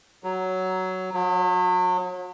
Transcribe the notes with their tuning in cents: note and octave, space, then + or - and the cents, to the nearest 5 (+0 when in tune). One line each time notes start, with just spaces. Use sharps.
F#3 +10
F#3 -35